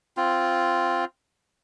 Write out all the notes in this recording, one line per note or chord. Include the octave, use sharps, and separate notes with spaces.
C4 F4